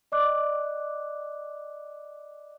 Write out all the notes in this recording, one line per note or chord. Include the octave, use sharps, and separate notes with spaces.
D5 D#5 D6 F#6